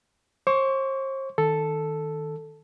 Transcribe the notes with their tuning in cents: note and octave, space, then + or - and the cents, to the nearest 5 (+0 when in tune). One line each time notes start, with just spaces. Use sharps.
C5 +40 C#6 +35
D#3 +0 A4 +0